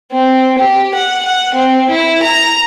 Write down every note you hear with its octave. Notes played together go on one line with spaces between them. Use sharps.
C4
G4
F#5
F#5
C4
E4
A#5